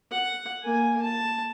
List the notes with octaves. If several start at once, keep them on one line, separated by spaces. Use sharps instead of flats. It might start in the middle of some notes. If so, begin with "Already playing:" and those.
F#5
A#3 G#5
A5